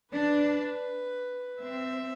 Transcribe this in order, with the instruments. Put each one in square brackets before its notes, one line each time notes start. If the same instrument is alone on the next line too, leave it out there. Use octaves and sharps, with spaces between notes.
[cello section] D4 [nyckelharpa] B4
[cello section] C4 [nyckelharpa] E5